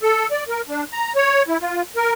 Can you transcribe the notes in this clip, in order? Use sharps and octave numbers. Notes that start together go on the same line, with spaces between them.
A4
D5
A#4
D4
A#5
C#5
E4
F4
A#4